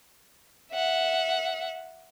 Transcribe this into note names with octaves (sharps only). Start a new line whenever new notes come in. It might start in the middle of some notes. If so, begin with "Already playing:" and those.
E5 F#5